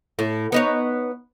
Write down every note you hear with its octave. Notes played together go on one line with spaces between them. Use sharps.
A2
B3 D#4 C#5